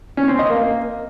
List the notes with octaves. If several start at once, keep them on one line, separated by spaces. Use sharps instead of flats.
C#4
C4
D#5
A#3